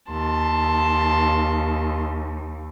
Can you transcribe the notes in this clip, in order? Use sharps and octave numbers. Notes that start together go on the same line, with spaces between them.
D#2 A5 C6